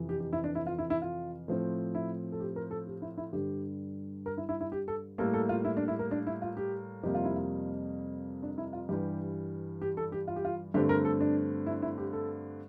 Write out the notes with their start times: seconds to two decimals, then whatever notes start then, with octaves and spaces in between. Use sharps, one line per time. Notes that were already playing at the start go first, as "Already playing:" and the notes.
Already playing: F2 C3 E3
0.09 G4
0.20 G4
0.33 E4
0.44 D4
0.55 E4
0.66 F4
0.79 E4
0.90 E4
1.02 F4
1.48 A2 F3 C4
1.95 E4
2.32 A4
2.40 G4
2.56 A#4
2.71 A4
2.87 G4
3.02 E4
3.18 E4
3.32 G2 D3 G3 G4
4.26 A#4
4.37 E4
4.49 E4
4.61 E4
4.72 G4
4.88 A4
5.18 A2 G3 A#3 A4
5.34 A4
5.49 F4
5.65 E4
5.77 D4
5.88 E4
5.99 A#4
6.11 D4
6.27 E4
6.42 F4
6.57 G4
7.03 F2 C3 G3 A#3 G4
7.15 F4
7.25 E4
7.36 F4
8.43 D4
8.58 E4
8.73 F4
8.89 G2 E3 G3 G4
9.82 G4
9.97 A4
10.12 G4
10.27 F4
10.36 G4
10.45 F4
10.74 G2 D3 A3 C4 G4
10.89 A#4
11.05 A4
11.21 D4
11.66 E4
11.82 E4
11.98 G4
12.13 A4